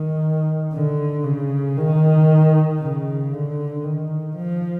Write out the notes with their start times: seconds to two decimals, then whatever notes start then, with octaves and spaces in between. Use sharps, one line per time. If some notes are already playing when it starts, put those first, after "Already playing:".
Already playing: D#3
0.73 D3
1.24 C#3
1.78 D#3
2.80 C#3
3.33 D3
3.84 D#3
4.37 F3